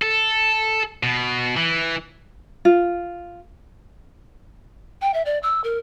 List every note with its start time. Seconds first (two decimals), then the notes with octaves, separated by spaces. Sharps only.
0.02 A4
1.03 B2
1.57 E3
2.65 F4
5.01 G5
5.14 E5
5.26 D5
5.43 E6
5.64 A#4